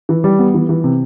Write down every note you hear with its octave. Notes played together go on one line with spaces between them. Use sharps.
E3
G3
B3
E3
E3
C3